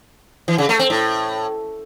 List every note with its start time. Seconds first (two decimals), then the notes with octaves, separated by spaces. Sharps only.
0.48 E3
0.58 C#3
0.69 A3
0.79 C4
0.90 A2